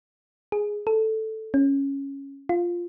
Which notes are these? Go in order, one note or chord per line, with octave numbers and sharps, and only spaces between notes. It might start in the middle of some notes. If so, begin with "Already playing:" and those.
G#4
A4
C#4
F4